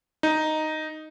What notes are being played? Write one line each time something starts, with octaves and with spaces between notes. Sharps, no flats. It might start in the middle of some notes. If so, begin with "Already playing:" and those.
D#4